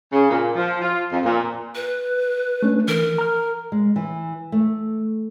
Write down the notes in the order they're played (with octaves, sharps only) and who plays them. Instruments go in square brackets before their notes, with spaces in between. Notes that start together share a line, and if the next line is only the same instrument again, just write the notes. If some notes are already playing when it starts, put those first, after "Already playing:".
[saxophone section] C#3
A#2
F3
F4
F2
A#2
[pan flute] B4
[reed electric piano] A3 C#4 D4
[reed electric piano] E3 [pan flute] A#4
[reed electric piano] A#5 F6
[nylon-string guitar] G#3
E3
A3